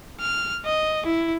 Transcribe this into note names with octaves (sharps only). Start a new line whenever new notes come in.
F6
D#5
E4